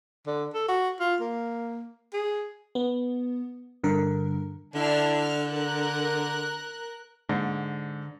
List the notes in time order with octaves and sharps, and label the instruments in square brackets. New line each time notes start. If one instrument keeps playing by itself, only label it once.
[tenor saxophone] D3
A4
F#4
F4
A#3
G#4
[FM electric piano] B3
G2 D3 A#4
[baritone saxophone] D3 [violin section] D4 E4 F6
[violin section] F6
A#4 F#6
[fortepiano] G#2 [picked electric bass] D3